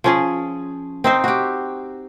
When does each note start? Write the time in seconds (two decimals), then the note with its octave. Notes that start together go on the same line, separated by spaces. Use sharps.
0.04 F3 C#4 G#4
1.04 C4 D#4 C5
1.24 F#4 G4